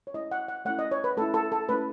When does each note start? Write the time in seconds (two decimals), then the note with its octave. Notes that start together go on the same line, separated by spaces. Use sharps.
0.07 C#5
0.14 A3 C#4 E4 D#5
0.31 F#5
0.48 F#5
0.65 A3 C#4 E4 F#5
0.79 D#5
0.91 C#5
1.04 B4
1.17 A3 C#4 E4 A4
1.34 A4
1.52 A4
1.69 A3 C#4 E4 B4